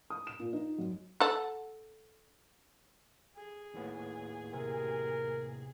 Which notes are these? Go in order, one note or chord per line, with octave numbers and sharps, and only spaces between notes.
D#6
E7
A#2
D#4
F#2
A4 F#5
G#4
D#2 A2 B3
C3 A#4